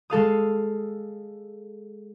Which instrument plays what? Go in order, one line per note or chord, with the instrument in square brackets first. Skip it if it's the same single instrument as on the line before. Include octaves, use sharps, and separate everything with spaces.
[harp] G#3 A4 F5 D#6